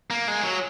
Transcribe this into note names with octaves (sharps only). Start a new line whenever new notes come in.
A#3
G#3
F#3